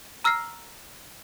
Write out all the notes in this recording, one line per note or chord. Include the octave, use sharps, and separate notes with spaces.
A#5 E6 F6 A#6 C7